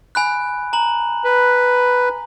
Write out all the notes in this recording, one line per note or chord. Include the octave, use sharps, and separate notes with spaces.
G#5 B5 F#6
A#5 F#7
B4